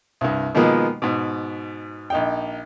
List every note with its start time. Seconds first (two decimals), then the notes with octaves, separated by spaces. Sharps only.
0.21 C2 G2
0.55 B2 D#3 F3 G#3 A#3 B3
1.02 G#2 B2
2.10 A#1 D#4 G5